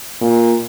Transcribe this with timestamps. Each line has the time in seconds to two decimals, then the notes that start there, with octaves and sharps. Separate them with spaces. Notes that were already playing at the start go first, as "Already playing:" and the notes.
0.22 A#2